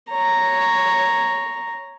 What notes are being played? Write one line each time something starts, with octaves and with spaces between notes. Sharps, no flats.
C#5 A#5